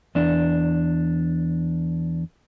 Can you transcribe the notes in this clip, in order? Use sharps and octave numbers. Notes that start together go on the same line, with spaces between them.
E2 D4